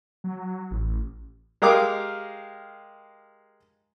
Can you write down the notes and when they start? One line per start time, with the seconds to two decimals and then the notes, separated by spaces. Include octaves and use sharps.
0.24 F#3
0.71 A1
1.62 G#3 G4 A#4 F5 D6